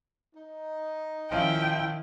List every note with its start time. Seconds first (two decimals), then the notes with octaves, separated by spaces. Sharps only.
0.34 D#4
1.32 D#3 F3 C#4 E4 G5